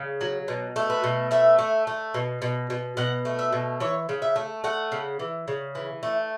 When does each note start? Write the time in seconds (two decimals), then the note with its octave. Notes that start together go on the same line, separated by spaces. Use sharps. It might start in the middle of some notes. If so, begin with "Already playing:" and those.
Already playing: C#3
0.21 F#3
0.48 B2
0.76 A3
0.90 B4
1.04 B2
1.31 A3 E5
1.59 A3
1.87 A3
2.14 B2
2.42 B2
2.70 B2
2.97 B2 F#5
3.25 A3
3.39 E5
3.53 B2
3.80 E3 C#5
4.09 C#3
4.22 E5
4.36 A3
4.64 A3 F#5
4.92 C#3
5.19 E3
5.48 C#3
5.75 E3
6.03 A3